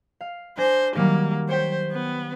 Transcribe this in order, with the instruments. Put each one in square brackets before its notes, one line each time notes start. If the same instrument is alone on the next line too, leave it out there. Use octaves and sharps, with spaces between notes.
[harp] F5
[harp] D4 G#5 A#6 [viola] C5
[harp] D#3 F#3 G3 [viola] A#3
[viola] C5 [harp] C#5 G5 B6
[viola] B3